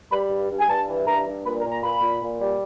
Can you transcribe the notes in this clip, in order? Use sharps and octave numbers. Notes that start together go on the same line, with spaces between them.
G3 B5
G2
G2
G#5
G2 A5
E3
G2 A#5
G2
A#2 B5
A#5
A#2
A#5
A#2 B5
A#2
A#2
G3